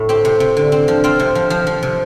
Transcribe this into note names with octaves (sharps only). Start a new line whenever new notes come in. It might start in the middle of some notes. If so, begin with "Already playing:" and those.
Already playing: A2 A4
C4 G4
C3
C3
D3
C4
F3
C4 F4
C3
F3
F3
F3
C3